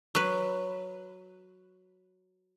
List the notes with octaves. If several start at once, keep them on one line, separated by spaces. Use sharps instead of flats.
F#3 B4